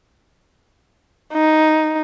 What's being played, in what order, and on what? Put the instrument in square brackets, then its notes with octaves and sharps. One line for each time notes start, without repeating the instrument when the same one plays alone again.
[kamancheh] D#4